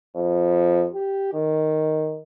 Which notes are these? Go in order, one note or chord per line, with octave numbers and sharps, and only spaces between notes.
F2
G4
D#3